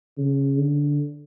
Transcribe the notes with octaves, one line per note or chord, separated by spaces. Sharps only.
C#3
D3